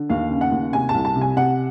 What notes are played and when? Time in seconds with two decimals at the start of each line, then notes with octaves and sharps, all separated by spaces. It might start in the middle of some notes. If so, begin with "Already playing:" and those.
Already playing: D3
0.10 D#2 F5
0.31 C#3
0.41 F#5
0.52 D#2
0.73 C3 G#5
0.89 A5
0.94 C2
1.05 A5
1.16 C3
1.21 G#5
1.37 C3 F#5